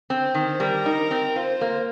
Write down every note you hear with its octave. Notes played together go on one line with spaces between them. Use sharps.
C4
C5
D#3
G3 A#4
D#4
C4
F4 C5
A#3